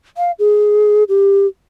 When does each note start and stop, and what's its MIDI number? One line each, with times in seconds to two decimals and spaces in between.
0.17 0.31 77
0.39 1.04 68
1.09 1.47 67